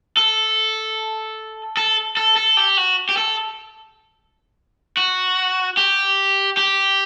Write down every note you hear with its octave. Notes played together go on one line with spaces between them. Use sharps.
A4
A4
A4
A4
G4
F#4
G4
A4
F#4
G4
G4